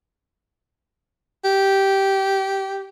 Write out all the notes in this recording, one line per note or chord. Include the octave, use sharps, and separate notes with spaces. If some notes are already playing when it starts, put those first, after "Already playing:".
G4